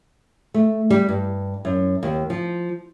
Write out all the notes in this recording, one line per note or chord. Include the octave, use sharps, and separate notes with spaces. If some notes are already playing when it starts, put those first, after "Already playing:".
A3
G3
G2
F#2
D#2
F3